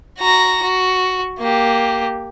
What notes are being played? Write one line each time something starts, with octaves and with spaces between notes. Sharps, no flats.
F#4 A#5
F#4
A#3 G4